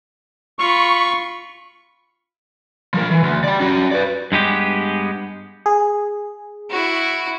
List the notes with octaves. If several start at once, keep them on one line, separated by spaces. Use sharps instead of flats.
F4 B5 C#6
F3 A#4
E3
D2
D5 G5
C#4 F#4
B4 D5
G2 G#3 B3 G4
G#4
E4 F#4